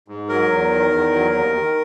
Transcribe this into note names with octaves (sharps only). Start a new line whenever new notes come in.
G#2
F#3 A#4
E2
D#3
E2
F#3
D#2
D#3